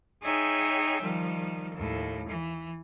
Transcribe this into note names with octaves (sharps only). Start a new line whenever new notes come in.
D#4 G#4 C#5 E5 G5 G#5
D#3 F3 G3
D#2 A2
E3